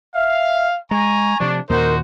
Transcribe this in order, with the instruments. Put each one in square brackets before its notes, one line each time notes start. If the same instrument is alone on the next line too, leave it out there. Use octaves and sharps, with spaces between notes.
[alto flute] E5 [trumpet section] F5
[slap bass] G#3 [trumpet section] G#5 A#5 [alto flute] C#6
[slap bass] C3 F3 [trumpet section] D4
[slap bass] D#2 A#2 D#3 [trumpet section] D#4 F#4 C5 [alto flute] A#4